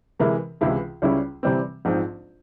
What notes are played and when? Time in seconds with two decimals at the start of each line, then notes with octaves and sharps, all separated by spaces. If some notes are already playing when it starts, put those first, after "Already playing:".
0.20 C3 E3 G#3 E4 A#4
0.61 C#2 C3 E3 G#3 E4
1.02 C#2 C#3 G3 C#4 E4
1.43 C3 E3 G3 C4
1.85 A#1 G#2 F3 C4